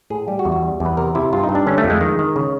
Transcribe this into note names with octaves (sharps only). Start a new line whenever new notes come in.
A2 G#4
G3 G4
F#4
E2
F#4
G3
E2
B4
C3 A#4
C3 E4
G2 F4
D#4
G2
D4
D3 C#4
A3
F2
G#3
D#3
D#3
C#3